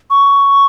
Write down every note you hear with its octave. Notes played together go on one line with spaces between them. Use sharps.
C#6